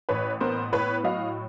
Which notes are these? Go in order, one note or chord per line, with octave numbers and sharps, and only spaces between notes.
A1 B4 C#5
B3 A#4 C5
A2 B4 C#5
F#3 D#5 F5